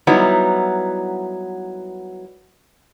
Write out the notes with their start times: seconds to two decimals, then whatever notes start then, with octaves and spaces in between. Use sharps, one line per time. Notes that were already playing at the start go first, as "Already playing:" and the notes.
0.07 F#3 G3 B3 D#4 E4